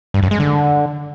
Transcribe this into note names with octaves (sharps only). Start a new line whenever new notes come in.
G2
F#2
G#3
D3